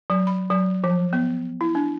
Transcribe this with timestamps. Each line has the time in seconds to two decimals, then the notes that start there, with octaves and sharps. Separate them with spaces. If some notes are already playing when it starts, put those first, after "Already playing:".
0.10 F#3
0.27 B5
0.50 F#3
0.84 F3
1.13 B3
1.61 E4
1.75 D4